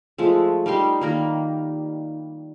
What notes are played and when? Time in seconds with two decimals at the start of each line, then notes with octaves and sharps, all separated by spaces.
0.18 F3 G#3 A3
0.66 G3 D#4 G4 C6
1.01 D#3 A#3 A#5